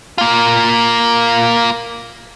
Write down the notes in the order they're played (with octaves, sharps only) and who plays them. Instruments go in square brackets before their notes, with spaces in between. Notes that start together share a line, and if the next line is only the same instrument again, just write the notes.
[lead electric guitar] A#3 F4